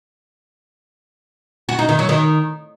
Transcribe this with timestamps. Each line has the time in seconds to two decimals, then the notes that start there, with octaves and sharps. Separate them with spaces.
1.69 F#4
1.79 D#4
1.89 D#3
1.99 F#3
2.09 D#3